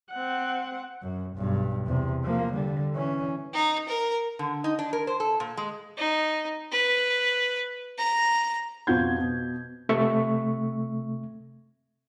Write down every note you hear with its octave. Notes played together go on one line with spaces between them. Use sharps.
C4 F#5
F#2
B1 G2
E2 C3
F3 A#3
D3 G3
E3 C#4
D#4
A#4
D3
D#4
D4
A#4
C5
A4
A#2
G#3
D#4
B4
A#5
F2 B2 F4 F#4 G6 G#6
B2
C3 A3 E5 C#6